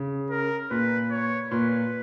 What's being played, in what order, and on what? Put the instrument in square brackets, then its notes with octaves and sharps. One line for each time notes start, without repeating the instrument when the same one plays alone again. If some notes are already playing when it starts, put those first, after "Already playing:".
Already playing: [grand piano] C#3
[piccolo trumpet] A#4
[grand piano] A#2 [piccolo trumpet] B4
[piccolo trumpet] C#5
[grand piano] A#2 [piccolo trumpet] B4